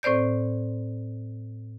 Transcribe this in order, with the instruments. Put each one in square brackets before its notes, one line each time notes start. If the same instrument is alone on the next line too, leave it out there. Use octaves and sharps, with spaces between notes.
[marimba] A2 C4 C5 D5 G6